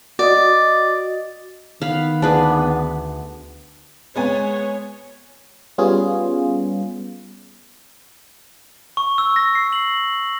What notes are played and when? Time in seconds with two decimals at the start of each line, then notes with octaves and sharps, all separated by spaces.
0.19 F#4 D5 D#5
1.81 D#3 B3 F5 B5
2.22 D2 D4 G#4 B4
4.16 G#3 B3 C#5 G#5
5.78 G3 B3 C#4 F4 G#4
8.97 C#6
9.18 E6
9.36 A#6
9.55 C7
9.73 F#7